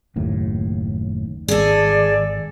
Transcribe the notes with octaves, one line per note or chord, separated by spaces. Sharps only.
F#1 D#2 A2
G#1 G#4 A4 D5